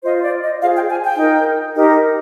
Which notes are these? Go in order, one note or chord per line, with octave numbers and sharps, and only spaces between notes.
F4 C5 D#5
D5
D#5
F4 G#4 C5 F5
G5
G#5
G5
D#4 A#4
D#4 G4 A#4